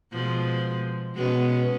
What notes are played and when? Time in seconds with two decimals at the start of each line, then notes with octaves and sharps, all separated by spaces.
0.12 B2 F3 G#3
1.15 B2 G#3 B3 C#4